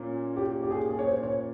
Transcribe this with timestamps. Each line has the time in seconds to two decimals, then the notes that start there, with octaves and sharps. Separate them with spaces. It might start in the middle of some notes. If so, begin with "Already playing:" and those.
Already playing: A#2 A#3 C#4
0.36 G4
0.63 G4
0.71 G#4
0.88 G#4
0.99 C#5
1.06 C5
1.23 C#5